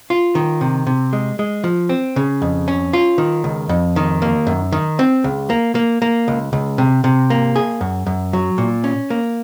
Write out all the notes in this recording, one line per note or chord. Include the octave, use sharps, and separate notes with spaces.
F4
D#3
C3
C3
G#3
G#3
F3
C4
C#3
F2
C#4
F4
D#3
C#2
F2
D#3
A#3
F#2
D#3
C4
C#2
A#3
A#3
A#3
C#2
C#2
C3
C3
A#3
G#4
F#2
F#2
F#3
A#2
C#4
A#3